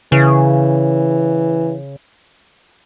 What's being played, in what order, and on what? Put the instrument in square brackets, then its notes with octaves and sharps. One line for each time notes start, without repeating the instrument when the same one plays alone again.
[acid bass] C#3 [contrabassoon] E3